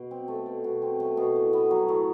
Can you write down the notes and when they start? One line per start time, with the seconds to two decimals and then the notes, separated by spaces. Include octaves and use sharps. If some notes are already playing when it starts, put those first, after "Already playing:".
Already playing: B2
0.11 C4
0.28 A3
0.46 B2
0.64 B2
0.82 C4
1.00 A3
1.17 B2
1.35 A2
1.53 B3
1.71 F#3
1.89 A2